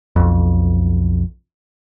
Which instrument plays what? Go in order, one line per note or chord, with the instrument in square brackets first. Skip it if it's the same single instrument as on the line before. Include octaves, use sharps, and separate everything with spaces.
[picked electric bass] B1 F2